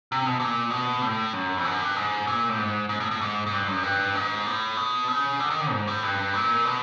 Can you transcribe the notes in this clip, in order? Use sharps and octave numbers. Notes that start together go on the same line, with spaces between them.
C3
B2
A#2
B2
A2
F#2
F2
F#2
G2
G#2
A#2
A2
G#2
G#2
A2
A2
G#2
G#2
G2
F#2
G2
G#2
A2
B2
C#3
D3
D#3
D3
G#2
A2
G2
A#2
B2